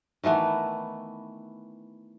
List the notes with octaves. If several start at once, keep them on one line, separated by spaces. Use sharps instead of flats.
D#3 E3 A3 B3